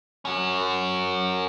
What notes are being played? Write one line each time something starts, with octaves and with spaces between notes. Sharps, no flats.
C#4 F#4